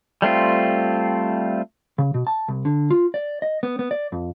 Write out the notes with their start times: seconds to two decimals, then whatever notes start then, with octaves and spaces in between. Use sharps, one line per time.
0.22 G3 A3 C4 F4
1.98 C#3
2.14 B2
2.27 A5
2.48 C2
2.65 D3
2.91 F4
3.14 D5
3.42 D#5
3.63 B3
3.79 B3
3.91 D5
4.12 F2